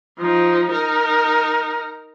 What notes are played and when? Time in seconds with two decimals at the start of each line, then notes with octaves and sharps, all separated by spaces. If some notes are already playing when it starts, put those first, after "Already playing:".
0.18 F3 D#4
0.71 D#4 A#4